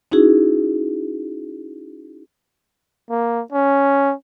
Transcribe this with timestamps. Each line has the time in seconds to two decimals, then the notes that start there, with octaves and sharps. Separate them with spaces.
0.12 C#4 D#4 E4 F#4 G#4
3.10 A#3
3.52 C#4